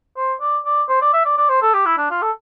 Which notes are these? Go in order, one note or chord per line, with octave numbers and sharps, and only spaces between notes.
C5
D5
D5
C5
D5
E5
D5
D5
C5
A4
G4
E4
D4
F4
A4